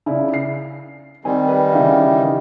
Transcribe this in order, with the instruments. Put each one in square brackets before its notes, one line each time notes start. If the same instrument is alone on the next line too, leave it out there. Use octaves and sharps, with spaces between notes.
[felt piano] C#3 E4 D5
C7
[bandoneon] D#3 G3 [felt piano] C4 G#5
[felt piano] B4
C#3 E3 F5